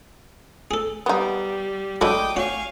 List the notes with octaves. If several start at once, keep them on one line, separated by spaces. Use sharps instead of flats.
G#4 A4
G3 B3 D#4
F#3 G#3 A3 D4 E4 G5 D6 D#6
F#4 C#5 F5 G#5 C#6